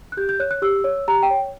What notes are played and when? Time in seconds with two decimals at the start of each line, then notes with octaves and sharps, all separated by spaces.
0.12 F#6
0.17 G4 G6
0.29 G6
0.40 C#5 F#6
0.51 F#6
0.62 G4 E6
0.84 C#5
1.08 G4 A#5
1.23 G5
1.30 C#5